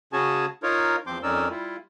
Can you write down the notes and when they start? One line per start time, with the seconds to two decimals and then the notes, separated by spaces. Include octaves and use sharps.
0.13 C#3 C#4 F#4 G#4 G#5 A5
0.63 D#4 F4 A#4 C#5
1.07 E2 F3 C4 C6 D6 G6
1.23 F2 C#4 D#4 A#4 D5 E6
1.50 G3 E4 F4